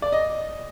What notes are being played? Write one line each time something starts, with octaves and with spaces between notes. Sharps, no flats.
D5
D#5